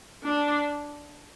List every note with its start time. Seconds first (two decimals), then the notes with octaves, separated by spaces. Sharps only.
0.24 D4